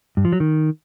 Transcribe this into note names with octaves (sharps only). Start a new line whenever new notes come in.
G2
F3
F#3
D#3